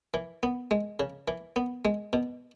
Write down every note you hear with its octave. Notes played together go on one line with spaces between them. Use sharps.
E3
B3
G#3
C#3
E3
B3
G#3
B2